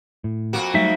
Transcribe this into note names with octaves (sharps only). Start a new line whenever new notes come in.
A2
F2 A#3 F#4
F#3 G3 A3 D#4 E5